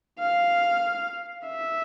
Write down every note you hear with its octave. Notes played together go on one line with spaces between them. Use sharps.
F5
E5